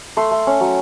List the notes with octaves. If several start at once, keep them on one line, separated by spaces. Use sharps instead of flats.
A3 C6
A3
C#4
F#3